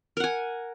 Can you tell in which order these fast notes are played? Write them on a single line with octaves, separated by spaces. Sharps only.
A#4 F#5 G#5